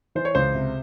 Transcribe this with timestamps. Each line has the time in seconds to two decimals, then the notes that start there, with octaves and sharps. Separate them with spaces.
0.15 E3 C5
0.25 C#5
0.35 C#2 C5
0.54 C3